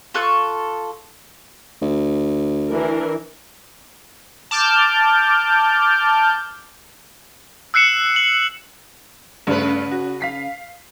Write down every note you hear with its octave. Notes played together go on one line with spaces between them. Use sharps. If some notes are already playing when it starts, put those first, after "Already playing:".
F4 A4 C#6 F#6
D2
E3 D4 A#4
A5 D6 F6 G6
E6 F#6 C7 C#7 E7
F#7
G2 C#3 A3 B4
F#4
F5 B6 C7